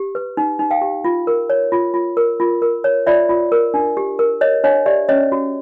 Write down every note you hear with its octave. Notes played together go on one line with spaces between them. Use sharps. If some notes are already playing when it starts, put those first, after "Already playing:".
Already playing: G4
B4
D#4
D#4
F5 G5
G4
F4
A#4
C#5
F4
F4
A#4
F4
A#4
C#5
F4 D5 E5
F4
A#4
D4
G4
A#4
C#5 D#5
D4 C#5 D#5
G4 D5 E5
C#4 C#5 D#5
F#4